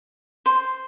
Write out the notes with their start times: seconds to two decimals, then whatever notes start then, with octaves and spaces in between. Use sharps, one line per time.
0.46 C5 C6